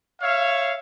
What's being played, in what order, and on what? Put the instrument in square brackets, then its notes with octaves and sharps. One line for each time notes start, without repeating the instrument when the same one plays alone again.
[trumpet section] C#5 E5 F5